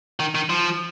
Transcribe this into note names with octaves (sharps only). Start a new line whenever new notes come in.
D#3
D#3
F3